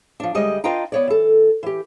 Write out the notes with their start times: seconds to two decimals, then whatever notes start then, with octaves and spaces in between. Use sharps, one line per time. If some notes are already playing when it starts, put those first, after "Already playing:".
0.20 F3 D4
0.35 D2 G3 G#3 D#5
0.64 D4 F4 B4 D#5 G5 A#5
0.92 B3 C#5 D5
1.07 E3 A4
1.63 E3 G4